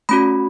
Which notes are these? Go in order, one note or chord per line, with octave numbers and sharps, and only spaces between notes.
A3 C#4 F#4 B5